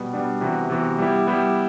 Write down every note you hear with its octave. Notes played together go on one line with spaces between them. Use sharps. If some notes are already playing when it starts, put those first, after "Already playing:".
Already playing: B2 G3 B3
B2 G3 B3 D4
C3 E3 B3 F#4
C3 E3 B3 F#4
G3 B3 E4 G4
G3 B3 E4 G4